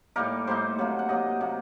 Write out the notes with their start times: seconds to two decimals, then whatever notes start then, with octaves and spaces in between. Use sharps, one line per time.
0.16 A2 G3 A#3 D#4 A#4
0.47 A2 G3 A#3 D#4 C5
0.78 C3 F#3 A#3
0.99 F#5
1.09 C3 F#3 A#3 D#5
1.40 C3 F#3 A#3